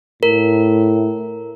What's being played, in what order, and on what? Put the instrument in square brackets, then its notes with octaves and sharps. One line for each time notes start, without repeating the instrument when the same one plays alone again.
[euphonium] A2 [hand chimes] A#4